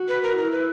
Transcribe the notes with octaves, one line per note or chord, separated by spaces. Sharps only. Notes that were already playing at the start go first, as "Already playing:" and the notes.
Already playing: F#4
B4
A#4
E4 A#4
B4